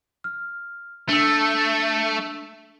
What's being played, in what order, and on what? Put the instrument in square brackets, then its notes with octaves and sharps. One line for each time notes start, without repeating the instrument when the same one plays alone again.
[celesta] F6
[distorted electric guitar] A3 [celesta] D4 E6